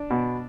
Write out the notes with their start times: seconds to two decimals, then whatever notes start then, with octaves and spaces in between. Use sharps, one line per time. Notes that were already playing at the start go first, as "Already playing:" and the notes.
Already playing: D4
0.10 B2